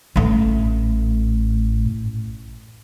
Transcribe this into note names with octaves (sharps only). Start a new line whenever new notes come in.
A1 A2